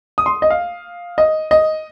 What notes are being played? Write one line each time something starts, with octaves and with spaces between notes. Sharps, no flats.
D#6
C6
D#5
F5
D#5
D#5